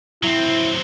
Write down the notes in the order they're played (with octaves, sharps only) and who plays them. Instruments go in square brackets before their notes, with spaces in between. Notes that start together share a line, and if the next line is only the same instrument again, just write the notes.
[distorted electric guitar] F#3 C4 [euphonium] E4